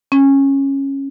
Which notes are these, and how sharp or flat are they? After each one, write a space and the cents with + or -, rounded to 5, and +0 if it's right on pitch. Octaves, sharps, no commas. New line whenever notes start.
C#4 -15